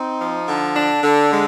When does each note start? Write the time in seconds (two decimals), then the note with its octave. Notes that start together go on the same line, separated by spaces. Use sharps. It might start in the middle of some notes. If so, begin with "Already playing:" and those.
Already playing: C4 D#4
0.20 F3
0.47 D3
0.75 D4
1.03 D3
1.31 G#3